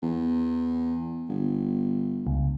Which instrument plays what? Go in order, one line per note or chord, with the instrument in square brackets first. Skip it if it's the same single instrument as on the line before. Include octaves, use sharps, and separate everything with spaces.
[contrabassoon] E2
G1
[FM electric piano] C#2